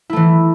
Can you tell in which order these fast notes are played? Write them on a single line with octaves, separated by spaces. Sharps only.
E4 A3 E3